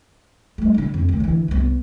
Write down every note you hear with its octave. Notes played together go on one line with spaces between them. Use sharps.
G3 A3
D3 D#4
F2
D#3 A3
D3 E3
C2 B3